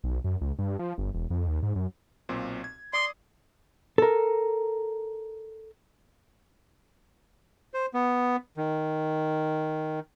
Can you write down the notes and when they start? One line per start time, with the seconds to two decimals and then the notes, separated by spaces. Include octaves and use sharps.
0.04 B1
0.24 F#2
0.41 C#2
0.59 G2
0.79 F3
0.98 G1
1.14 E1
1.30 F2
1.48 D#2
1.63 G#2
1.76 F#2
2.29 B1 A#2 C4
2.64 G#6
2.93 D5 C6 D6 D#6
3.98 A4 A#4
7.74 C5
7.94 B3
8.57 D#3